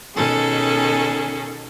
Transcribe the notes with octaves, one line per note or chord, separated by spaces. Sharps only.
B2 D#3 C#4 G#4 A4